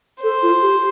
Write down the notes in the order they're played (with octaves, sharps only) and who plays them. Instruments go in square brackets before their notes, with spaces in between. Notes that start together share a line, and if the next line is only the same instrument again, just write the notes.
[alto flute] A4 [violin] C5
[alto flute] F4
G4